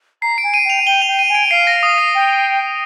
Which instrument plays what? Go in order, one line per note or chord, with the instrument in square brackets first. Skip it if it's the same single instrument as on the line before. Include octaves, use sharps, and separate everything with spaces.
[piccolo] A#5 [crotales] C7
[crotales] D7
[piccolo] G#5
[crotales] D#7
[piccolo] G5
[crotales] F7
[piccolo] G5 [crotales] G7
[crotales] F7
[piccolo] G5
[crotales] D#7
[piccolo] G#5
[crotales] D7
[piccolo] F5 [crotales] C7
[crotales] A#6
D#6
C7
[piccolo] G5